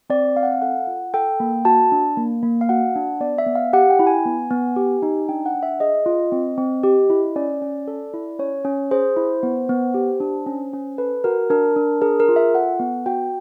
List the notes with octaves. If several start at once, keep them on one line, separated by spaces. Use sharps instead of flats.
C4 D5
C4 F5
F#5
F5
A4 F#5
F4
A4 G5
A#3
F#4 A5
D4
A#3
A#3
F5
F#4 F#5
D4
B3 D5
E5
B3
F5
G4 F#5
G5
E4
G#5
B3
B3
G4
D#4
D4 G5
F#5
D4
E5
G#4 D#5
F4
C4
C4
G4
E4
C#4 D5
C#4
A4
E4
C#4 C#5
C#4
G#4 C5
E4
B3
B3
G4
D4
C#4
C#4
A4 B4
F#4 A#4
D4 A#4
D4
G#4 A#4
A#4
F4
E5
A4 F#5
B3
F#4 G5